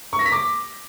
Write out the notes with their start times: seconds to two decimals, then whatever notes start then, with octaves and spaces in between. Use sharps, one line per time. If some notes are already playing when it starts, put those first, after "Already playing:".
0.13 C#6
0.19 A#6
0.26 B6
0.32 D6